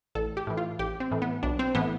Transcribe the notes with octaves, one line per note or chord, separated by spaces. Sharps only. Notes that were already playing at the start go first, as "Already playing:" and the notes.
A1 A4
G4
A2 E3
F4
A1 G4
C4
A2 E3
B3
B1 D4
C4
A2 E3 B3